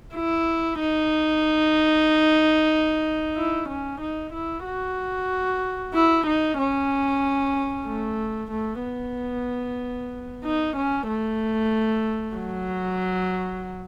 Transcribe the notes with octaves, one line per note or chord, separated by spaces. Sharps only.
E4
D#4
E4
C#4
D#4
E4
F#4
E4
D#4
C#4
A3
A3
B3
D#4
C#4
A3
F#3